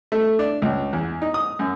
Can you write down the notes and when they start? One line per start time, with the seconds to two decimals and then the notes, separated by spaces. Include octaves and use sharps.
0.12 A3
0.39 D4
0.62 C#2
0.93 E2
1.22 D#4
1.34 D#6
1.59 F#2